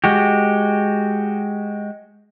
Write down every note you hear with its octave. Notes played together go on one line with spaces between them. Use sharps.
G#3 F#4 G4